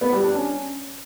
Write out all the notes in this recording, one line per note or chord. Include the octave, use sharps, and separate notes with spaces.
B3
G3
D4
C#4